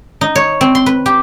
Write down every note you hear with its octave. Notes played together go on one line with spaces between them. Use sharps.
D#4
C#5
C4
C6
B4
G4